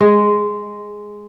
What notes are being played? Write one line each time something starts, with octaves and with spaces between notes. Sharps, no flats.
G#3